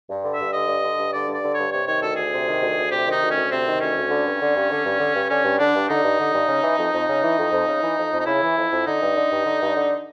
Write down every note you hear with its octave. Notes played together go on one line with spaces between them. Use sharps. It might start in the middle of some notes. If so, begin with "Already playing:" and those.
G2
D3
E5
G2
D3 D#5
G2
D3
G2
D3 D5
G2
D5
D3
G2 C#5
C3 C#5
D#3 C#5
D2 A4
D2 G#4
C3
D#3
D2
D2
C3 G4
D#3 D#4
D2
D2 C#4
C3 C4
D#3
D2 C#4
D2
D3
G2
D3
G2
D3
G2
D3
G2
D3 C#4
G2
D3 D4
G2
D3 D#4
G2
D3
G2
C#3
E3
F2
F2
C#3
E3
F2
F2
C#3
E3
F2
F2
D#4
C#3 E4
E3
F2
F2
D3 D#4
G2
D3
G2
D3
G2
D3